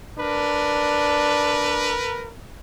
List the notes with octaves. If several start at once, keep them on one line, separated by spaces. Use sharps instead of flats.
D4 A#4 B4